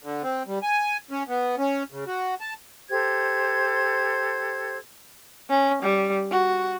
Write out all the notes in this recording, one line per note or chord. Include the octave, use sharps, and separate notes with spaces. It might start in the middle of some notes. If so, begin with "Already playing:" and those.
D3
C4
G3
G#5
C#4
B3
C#4
C#3
F#4
A5
G4 A4 C5 G#6
C#4
G3
F#4